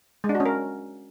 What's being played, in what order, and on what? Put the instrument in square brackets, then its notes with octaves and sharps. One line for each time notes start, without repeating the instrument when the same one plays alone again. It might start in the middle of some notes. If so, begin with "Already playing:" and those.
[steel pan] G#3
D4
F#4
C#4
A#4